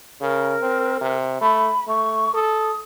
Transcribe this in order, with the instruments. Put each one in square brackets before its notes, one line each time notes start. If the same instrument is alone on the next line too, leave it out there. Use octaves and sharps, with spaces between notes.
[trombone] C#3 [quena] A#4
[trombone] C4
C3
[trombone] A3 [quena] B5
[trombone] A3 [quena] C#6
[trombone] A4 [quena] D#6